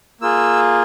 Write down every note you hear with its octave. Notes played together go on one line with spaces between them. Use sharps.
A#3 F4 G#4 E6